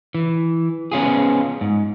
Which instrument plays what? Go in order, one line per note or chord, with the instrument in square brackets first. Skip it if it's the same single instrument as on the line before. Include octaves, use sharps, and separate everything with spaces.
[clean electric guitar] E3
B3 C#4 F4 G#4
G#2